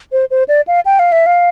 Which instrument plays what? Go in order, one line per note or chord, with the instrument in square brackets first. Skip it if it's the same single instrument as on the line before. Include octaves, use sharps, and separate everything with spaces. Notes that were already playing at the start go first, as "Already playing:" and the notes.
[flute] C5
C5
D5
F5
G5
F5
E5
F5